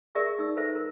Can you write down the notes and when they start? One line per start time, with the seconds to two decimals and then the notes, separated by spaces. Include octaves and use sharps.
0.15 G#4 A#4 D5 E5 C#6 D#6
0.39 D#4 D#6 E6
0.57 F4 A4 B4 C5 E5
0.75 A#4